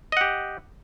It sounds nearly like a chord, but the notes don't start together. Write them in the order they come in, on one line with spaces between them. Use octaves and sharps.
D#5 F#5 G4